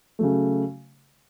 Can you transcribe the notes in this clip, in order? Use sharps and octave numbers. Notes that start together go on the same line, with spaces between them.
C#3 F#3 A3